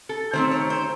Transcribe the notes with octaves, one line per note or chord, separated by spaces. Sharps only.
A4
D#3 A3 C4 C5
C#5
C5